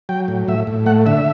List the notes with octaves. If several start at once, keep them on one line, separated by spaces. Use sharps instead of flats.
F#3 G5
A2
A2 E5
A2
A3 F#5
D3 E5